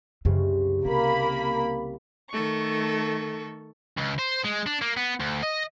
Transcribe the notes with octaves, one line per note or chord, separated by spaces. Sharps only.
C2 F#2 C#3
C3 A#3 B5
D#3 A3 A4 C#6
C#2
C5
G#3
D4
A#3
B3
D2
D#5